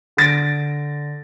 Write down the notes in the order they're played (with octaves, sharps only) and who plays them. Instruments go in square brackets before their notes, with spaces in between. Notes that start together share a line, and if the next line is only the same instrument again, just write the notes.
[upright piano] D3 A6 A#6 D7